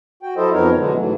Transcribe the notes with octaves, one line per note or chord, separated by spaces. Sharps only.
F#4 G5
F#3 E4 A4 C5 D#5
F2 F3 B3 D#4 A#4 C#5
B2 D3 E3 F#3 G#3
G#2 E3 F#3 A3